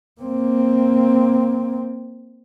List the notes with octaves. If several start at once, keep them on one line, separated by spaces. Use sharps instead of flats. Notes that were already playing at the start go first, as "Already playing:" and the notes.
A#3 C4